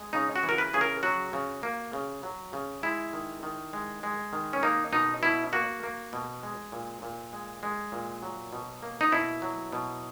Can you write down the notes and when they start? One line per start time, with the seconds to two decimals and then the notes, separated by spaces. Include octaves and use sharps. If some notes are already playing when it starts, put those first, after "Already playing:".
Already playing: G#3
0.13 C#3 D#4
0.36 F#4
0.43 E3
0.49 A#4
0.58 B4
0.74 C#3 G#4
0.81 A#4
1.03 F#3 F#4
1.33 C#3
1.63 A#3
1.93 C#3
2.23 F#3
2.53 C#3
2.83 G#3 E4
3.13 D#3
3.43 D#3
3.73 G#3
4.03 G#3
4.33 D#3
4.53 C#4
4.63 A#3 D#4
4.93 B2 D#4
5.23 B2 E4
5.53 A#3 F#4
5.83 A#3
6.13 B2
6.43 G#3
6.72 A#2
7.02 A#2
7.33 G#3
7.63 G#3
7.92 A#2
8.22 F#3
8.53 B2
8.82 A#3
9.01 D#4
9.12 B2 E4
9.42 F#3
9.73 B2